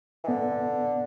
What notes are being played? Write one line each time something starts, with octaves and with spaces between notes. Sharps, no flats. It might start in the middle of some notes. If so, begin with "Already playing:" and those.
E3
D3 B3